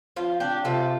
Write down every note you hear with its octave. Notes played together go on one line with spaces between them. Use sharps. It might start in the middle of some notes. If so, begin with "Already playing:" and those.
F3 F4
D4 G4
C3 F4 A4